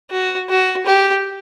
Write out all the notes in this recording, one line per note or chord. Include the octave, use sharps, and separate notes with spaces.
F#4
F#4
G4